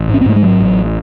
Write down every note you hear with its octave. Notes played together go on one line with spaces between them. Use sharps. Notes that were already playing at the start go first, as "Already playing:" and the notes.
Already playing: A1
G#2
C#4
C4
G#2 A3
G#3
A1 F#3
A1